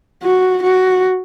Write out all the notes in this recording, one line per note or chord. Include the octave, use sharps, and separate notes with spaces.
F#4
F#4